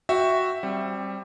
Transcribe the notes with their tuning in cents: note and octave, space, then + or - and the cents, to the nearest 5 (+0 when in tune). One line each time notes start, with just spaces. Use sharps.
F#4 +0 E5 +0 G5 +0
G3 +0 C4 +25